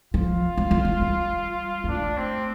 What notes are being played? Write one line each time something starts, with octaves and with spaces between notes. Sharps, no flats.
F3 F4
G3
F3
G3
G3
G3
A3 D4
C4